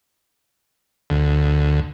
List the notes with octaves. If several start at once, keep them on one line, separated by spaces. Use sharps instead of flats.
D2